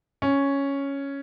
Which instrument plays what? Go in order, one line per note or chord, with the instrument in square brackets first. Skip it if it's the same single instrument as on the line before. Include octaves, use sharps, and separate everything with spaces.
[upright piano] C#4